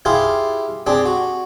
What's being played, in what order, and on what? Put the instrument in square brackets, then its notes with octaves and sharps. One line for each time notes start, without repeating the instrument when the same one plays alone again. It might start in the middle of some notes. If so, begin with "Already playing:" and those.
[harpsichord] E4 F4 G4 G#4 C5 F5
C4 D4 G4 G#4
F#4